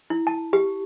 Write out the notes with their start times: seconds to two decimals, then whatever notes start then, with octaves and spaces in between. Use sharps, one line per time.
0.10 E4
0.27 A5
0.53 G4